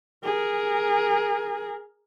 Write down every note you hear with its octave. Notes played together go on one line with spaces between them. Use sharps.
G#4 A#4